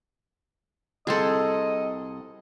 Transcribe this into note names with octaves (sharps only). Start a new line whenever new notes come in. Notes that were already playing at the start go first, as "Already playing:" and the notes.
C2 C4 G#4 A4 C5 D#5